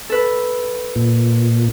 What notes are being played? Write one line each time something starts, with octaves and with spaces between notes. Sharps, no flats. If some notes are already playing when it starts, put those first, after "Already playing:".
A4 B4
A#2